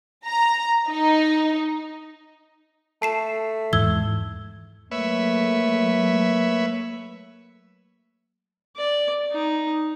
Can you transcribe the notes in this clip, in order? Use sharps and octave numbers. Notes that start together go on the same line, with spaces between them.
A#5
D#4
A3 A5 C7 E7
E2 G#2 E3 E6 G#6 G7
F#3 A3 A#3 B4 C#5 E5
D5
D#4